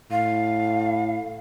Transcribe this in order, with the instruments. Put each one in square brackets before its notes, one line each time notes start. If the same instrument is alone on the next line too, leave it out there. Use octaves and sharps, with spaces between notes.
[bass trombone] A2 [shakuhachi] F5